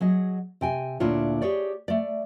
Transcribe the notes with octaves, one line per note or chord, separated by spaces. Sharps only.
F#3 G#4 D#5
C3 G5 G#5
D2 A#2 D4 E4 F4 C#5
G4 G#4 C#5 D5
A3 D5